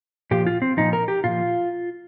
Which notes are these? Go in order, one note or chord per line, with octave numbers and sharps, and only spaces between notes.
A#2 F3 G4
F4
C4
A#2 F3 D#4
A#4
G4
A#2 F3 F4